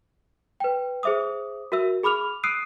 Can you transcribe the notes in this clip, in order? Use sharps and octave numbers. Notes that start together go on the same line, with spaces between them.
B4 G5
G#4 C5 E5 D6 D#6
F#4 A#4 E5 E6
G#4 B5 D6 F6 F7
D#6 E6 F#6 C7 D7 D#7